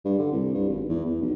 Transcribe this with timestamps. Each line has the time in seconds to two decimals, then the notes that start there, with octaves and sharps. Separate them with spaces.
0.05 G2
0.19 D3
0.32 C2
0.54 G2
0.68 G#1
0.89 E2
1.05 E2
1.21 B1